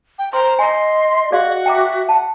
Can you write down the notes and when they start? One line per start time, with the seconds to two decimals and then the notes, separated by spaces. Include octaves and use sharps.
0.19 G5
0.33 C5 A#5 C6
0.59 D#5 G#5 A#5 C6
1.32 F#4 G#4 D5 F5
1.66 E5 G5 A#5 D6
2.09 F#5 A5